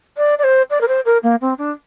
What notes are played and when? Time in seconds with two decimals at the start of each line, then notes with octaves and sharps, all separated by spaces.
0.17 D5
0.39 D5
0.44 C5
0.71 D5
0.81 A#4
0.88 C5
1.05 A#4
1.23 A#3
1.41 C4
1.58 D4